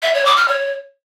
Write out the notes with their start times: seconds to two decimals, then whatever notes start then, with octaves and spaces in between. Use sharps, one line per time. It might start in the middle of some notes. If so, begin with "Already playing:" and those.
0.02 E5
0.14 C#5
0.25 D6
0.37 F6
0.48 C#5